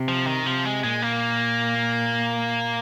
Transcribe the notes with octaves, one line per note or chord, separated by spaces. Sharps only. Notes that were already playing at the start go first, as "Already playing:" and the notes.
Already playing: C3
F3
D#3
C3 F3
G#3
A#2 G#3
A#3